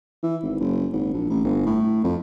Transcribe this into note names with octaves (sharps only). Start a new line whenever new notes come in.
E3
G#1
F#1
G#1
A#1
A1
G1
A2
F2